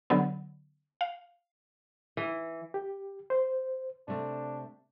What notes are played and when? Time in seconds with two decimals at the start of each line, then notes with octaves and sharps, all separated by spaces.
0.10 D3 F#3 B3
1.01 F5
2.17 E3
2.74 G4
3.30 C5
4.08 C3 A3 D4